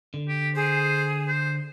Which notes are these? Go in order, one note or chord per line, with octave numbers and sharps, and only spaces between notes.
D3
G4
G#4 C5
C5